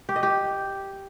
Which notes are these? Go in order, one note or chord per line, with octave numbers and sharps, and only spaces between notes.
G4
D#5
G4